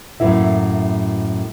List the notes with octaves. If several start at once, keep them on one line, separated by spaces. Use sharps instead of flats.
F#2 A2 E3 A#3 E4 E5